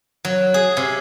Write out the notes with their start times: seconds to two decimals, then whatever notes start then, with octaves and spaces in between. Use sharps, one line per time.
0.25 F#3
0.54 G#4
0.77 C3